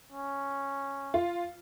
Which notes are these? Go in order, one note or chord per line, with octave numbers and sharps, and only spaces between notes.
C#4
F4